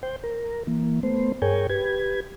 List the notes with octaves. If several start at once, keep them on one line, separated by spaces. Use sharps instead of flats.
C5 G5
A#4
E3 A#3
A3 B3 C5
G2 G#4 A#4 C#5 G5 G#5
G4 B4 G#6